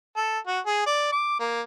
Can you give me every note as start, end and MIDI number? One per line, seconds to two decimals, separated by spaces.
0.16 0.38 69
0.47 0.59 66
0.66 0.83 68
0.86 1.08 74
1.12 1.39 86
1.40 1.61 58